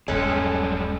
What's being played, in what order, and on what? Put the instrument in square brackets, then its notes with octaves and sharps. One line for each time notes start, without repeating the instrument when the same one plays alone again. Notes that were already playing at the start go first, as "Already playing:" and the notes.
[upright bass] D#1 G2 [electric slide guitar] G3 G#3 G#4 [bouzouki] C#4 A4 B4